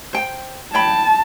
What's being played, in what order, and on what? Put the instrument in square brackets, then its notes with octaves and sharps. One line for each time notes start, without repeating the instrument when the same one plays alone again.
[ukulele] C5 G5
[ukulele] C#5 G5 B5 [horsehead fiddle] A5